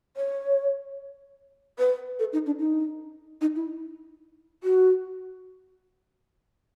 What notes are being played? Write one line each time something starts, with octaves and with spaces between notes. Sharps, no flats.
C#5
B4
A4
D#4
D4
D#4
D#4
E4
F#4